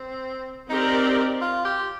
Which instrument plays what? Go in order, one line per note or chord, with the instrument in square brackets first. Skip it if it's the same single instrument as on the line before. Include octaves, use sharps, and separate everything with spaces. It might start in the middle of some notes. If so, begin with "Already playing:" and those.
Already playing: [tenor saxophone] C4
[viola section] C4 G4 A#4 D5 [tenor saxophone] D#4
[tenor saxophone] F4
G4